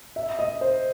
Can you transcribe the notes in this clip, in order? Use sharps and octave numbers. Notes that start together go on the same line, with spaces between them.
E5
D#5
C5